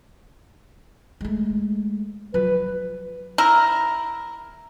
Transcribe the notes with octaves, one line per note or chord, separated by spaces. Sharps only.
G#3 A3
F3 F#3 B4
E4 A#4